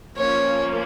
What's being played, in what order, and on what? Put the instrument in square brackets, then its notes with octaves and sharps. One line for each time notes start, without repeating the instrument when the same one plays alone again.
[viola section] F3 A#3 C#4 [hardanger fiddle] C#5